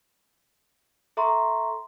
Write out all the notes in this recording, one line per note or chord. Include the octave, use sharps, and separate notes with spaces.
A4 E5 A#5 C6 C#6